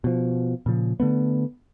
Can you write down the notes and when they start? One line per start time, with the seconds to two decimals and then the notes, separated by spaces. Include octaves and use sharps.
0.04 B2 F3
0.66 A#2 C#3 F3
1.00 D3 A3 B3